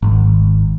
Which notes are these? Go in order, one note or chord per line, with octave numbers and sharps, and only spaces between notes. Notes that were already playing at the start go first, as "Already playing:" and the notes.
G#1